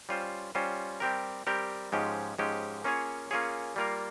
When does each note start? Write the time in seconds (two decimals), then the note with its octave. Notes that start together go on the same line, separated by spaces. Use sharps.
0.09 G3 C#4 F4 C5
0.55 G3 C#4 F4 C5
1.00 G3 C4 G4 A#4
1.47 G3 C4 G4 A#4
1.92 G#2 F3 G#3 C#4 G4
2.38 G#2 F3 G#3 C#4 G4
2.84 A#3 C#4 F4 G#4 C#5
3.31 A#3 C#4 F4 G#4 C#5
3.76 G3 A#3 F4 A#4 F5